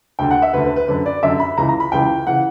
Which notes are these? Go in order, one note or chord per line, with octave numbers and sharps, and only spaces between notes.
D2 D3 G5
F#5
E5
D2 D3 B4
B4
B4
F#2 D3 B4
D5
F#2 D3 E5
B5
C#2 C#3 E3 A#5
A#5
B5
C#2 C#3 E3 G5
C#3 E3 F#5